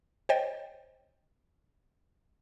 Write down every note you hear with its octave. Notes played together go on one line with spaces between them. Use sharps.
C5 C#5 D#5 G5 A6